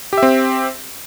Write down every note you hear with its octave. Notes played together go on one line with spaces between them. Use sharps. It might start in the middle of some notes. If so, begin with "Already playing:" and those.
C4 G4 E5